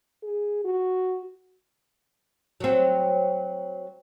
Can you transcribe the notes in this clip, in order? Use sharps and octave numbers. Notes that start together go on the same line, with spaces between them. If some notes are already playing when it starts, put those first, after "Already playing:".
G#4
F#4
F#3 C4